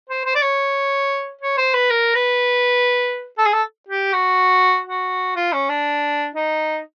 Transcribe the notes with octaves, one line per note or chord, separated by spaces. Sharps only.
C5
C5
D5
C#5
C#5
C5
B4
A#4
B4
A4
G#4
A4
G4
F#4
F#4
F4
C#4
D4
D#4